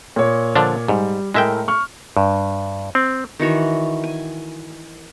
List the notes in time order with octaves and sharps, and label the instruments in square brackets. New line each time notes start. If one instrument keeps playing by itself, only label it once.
[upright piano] A#2 C#5
[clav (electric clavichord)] D3 F3 D4
[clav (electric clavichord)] G#2 [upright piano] G3
[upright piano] A2 A3 A#4 [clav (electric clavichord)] G#3 E5 G5
[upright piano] C#6 F6
[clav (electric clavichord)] G2
C4
[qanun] D#3 E3 F#4 C#5
G#5